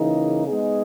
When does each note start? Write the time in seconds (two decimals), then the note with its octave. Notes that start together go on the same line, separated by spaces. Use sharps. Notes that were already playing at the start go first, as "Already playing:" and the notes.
Already playing: C#3 E3 A#3 D#4 G#4
0.46 G#3 B3 D#4 G#4